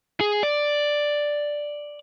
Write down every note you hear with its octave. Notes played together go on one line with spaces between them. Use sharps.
G#4
D5